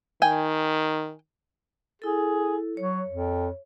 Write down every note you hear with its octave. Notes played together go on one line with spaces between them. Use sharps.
D#3 G5 G#5
E4 G#4 A4
F#3 C#5
F2